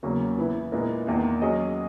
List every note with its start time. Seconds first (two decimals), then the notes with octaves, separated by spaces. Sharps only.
0.03 E2 C#3 F#3 A#3 C#4
0.38 E3 B3 E4
0.72 A#2 G#3 B3 E4 A#4
1.07 E2 D#3 A#3
1.41 F#3 C#4 G#4 D#5